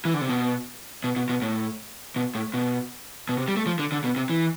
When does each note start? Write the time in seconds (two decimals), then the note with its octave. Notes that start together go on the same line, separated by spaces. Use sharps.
0.05 E3
0.14 D3
0.21 C3
0.29 B2
1.04 B2
1.16 B2
1.29 B2
1.42 A2
2.16 B2
2.35 A2
2.54 B2
3.29 B2
3.38 C3
3.48 G3
3.57 A3
3.66 F3
3.79 D3
3.92 D3
4.04 B2
4.16 C3
4.30 E3